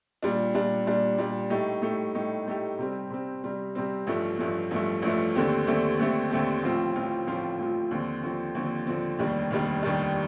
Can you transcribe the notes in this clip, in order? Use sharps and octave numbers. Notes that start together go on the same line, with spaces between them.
A#2 G3 D4
A#2 G3 D4
A#2 G3 D4
A#2 G3 D4
A2 A3 D#4 G4
A2 A3 D#4 G4
A2 A3 D#4 G4
A2 A3 D#4 G4
C3 G3 C4
C3 G3 C4
C3 G3 C4
C3 G3 C4
A1 G2 F3 A3
A1 G2 F3 A3
A1 G2 F3 A3
A1 G2 F3 A3
D#2 D3 A3 C4 G4
D#2 D3 A3 C4 G4
D#2 D3 A3 C4 G4
D#2 D3 A3 C4 G4
A1 A2 F3 C4 F4
A1 A2 F3 C4 F4
A1 A2 F3 C4 F4
A1 A2 F3 C4 F4
D#2 D3 F3 C4
D#2 D3 F3 C4
D#2 D3 F3 C4
D#2 D3 F3 C4
F1 D#2 D#3 G3 D4
F1 D#2 D#3 G3 D4
F1 D#2 D#3 G3 D4